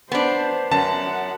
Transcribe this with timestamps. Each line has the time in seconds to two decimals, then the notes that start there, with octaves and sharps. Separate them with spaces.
0.12 B3 D4 C5
0.72 F#2 F#5 A5